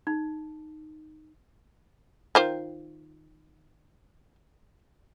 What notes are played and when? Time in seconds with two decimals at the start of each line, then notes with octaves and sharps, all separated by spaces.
0.07 D#4
2.35 D#3 F4 C5